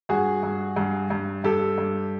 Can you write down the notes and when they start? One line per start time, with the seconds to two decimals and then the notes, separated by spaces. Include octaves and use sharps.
0.09 G2 F#4 G#4
0.43 G2
0.76 G2
1.10 G2
1.44 G2 G4 A4
1.78 G2